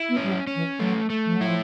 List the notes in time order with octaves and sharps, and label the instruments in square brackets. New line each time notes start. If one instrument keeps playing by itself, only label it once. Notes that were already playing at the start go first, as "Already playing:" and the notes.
Already playing: [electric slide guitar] E4
[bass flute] B3
[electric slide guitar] C#4
[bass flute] G3
F#3
[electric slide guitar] C#4
[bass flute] E3
[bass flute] F#3 [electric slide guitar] A3
[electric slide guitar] A3
[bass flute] F3
F#3
[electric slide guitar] E4
[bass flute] F3